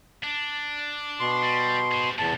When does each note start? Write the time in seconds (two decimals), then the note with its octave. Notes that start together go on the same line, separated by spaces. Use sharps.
0.24 D4
1.20 B2 C6
1.43 G3
1.92 G#4 C5
2.19 E2 A2 C3 A5